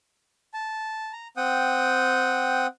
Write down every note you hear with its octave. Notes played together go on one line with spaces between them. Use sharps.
A5
A#5
C4 F#5 G5 D#6